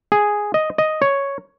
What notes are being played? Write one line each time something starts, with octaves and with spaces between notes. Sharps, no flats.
G#4
D#5
D#5
C#5